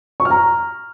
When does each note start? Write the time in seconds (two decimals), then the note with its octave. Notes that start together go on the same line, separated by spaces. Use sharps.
0.20 C#6
0.25 F6
0.30 A#5